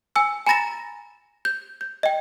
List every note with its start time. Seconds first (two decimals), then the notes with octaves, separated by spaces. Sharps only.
0.16 G#5 E6
0.47 G#5 A#5 B5 A6 A#6 E7
1.45 G6
1.81 G6
2.03 D#5 G5